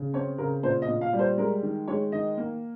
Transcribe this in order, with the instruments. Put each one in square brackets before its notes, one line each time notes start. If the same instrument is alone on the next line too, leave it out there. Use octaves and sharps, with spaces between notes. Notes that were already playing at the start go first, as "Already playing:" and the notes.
Already playing: [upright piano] C#3
C4 C#5
C#3 A#4
A#2 C5
D#5
A#2
F5
G3
C5
G#3 A#4
D#3
G#3 C#5
D#3 D#5
A#3